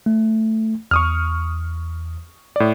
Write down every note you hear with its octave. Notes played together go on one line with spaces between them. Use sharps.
A3
E2 C#6 D#6 F6
A2 D5